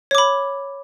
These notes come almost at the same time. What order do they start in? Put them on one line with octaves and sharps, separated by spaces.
C#5 D6 B5